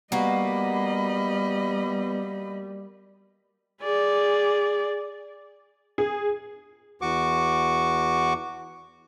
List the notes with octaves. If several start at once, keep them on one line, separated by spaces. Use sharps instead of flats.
G3 A#3 B3 F#4 D#5 B5
G#4 D5
G#4
E2 F#4 C#6 D6